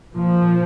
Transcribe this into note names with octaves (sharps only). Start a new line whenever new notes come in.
A#2 F3